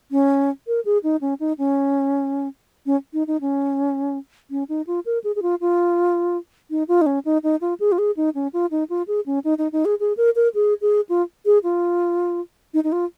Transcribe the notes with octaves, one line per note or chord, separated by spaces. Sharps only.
C#4
A#4
G#4
D#4
C#4
D#4
C#4
C#4
D#4
D#4
C#4
C#4
D#4
F4
A#4
G#4
G#4
F4
F4
D#4
F4
D#4
C#4
D#4
D#4
F4
G#4
F4
G#4
D#4
C#4
F4
D#4
F4
G#4
C#4
D#4
D#4
D#4
G#4
G#4
A#4
A#4
G#4
G#4
F4
G#4
F4
D#4
D#4
F4